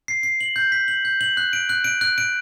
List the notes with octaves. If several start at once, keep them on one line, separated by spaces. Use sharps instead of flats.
C7
C7
F#7
G6
B6
F#7
G6
F#7
F#6
D7
F#6
D7
F#6
D7